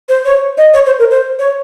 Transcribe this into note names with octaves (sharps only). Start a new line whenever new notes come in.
C5
C#5
D#5
C#5
C5
A#4
C5
C#5